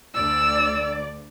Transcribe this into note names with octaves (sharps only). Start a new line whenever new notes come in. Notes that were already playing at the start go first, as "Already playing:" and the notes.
D2 D5 E6